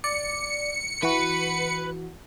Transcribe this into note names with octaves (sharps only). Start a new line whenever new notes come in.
D5 C#7
E3 F#4 B4